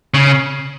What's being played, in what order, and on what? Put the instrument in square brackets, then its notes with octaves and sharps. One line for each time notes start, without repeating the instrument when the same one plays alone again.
[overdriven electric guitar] C#3